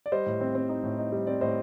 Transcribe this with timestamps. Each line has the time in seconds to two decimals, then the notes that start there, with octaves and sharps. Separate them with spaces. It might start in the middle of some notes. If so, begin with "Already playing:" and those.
0.06 D5
0.12 G3 C5 D#5
0.26 A2
0.41 C4
0.55 C4
0.69 D#4
0.83 A2
0.98 D#4
1.12 G3
1.27 C4 D5
1.41 A2 C5 D#5